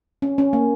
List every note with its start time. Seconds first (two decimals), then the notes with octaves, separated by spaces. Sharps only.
0.22 C#4
0.38 C#4
0.53 A#3